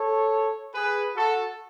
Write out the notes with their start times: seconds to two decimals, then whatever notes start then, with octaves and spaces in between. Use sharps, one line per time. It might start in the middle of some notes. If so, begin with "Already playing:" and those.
Already playing: A4 C#5
0.74 G#4 B4
1.15 F#4 A4